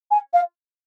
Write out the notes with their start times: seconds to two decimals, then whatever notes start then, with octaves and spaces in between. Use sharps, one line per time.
0.11 G#5
0.33 F5